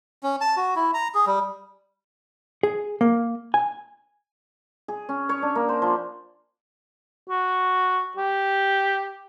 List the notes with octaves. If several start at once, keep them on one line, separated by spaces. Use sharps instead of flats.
C#4
A5
F#4
E4
A#5
G#4
G3
G#4
A#3
G#5
G#4
C#4
C#5
D4
A#3
C5
F3
F#4
G4